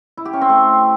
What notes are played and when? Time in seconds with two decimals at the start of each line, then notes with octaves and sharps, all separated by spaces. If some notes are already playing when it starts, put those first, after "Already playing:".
0.17 E4
0.25 G4
0.33 C#4
0.41 C4
0.49 A3